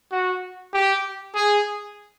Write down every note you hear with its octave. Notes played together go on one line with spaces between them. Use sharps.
F#4
G4
G#4